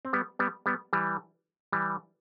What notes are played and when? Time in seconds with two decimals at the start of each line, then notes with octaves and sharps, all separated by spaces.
0.05 C4
0.13 G3 B3
0.39 G3 B3
0.66 G3 B3
0.93 E3 G3
1.72 E3 G3